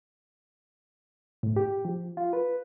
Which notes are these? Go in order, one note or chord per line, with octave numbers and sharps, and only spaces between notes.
A2
G4
F3
F4
B4